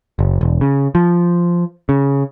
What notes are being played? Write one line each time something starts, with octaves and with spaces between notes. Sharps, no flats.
F#1
E1
C#3
F3
C#3